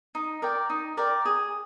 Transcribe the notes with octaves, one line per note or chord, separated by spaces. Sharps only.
D#4
A#4 D5 G5
D#4
A#4 D5 G5
G#4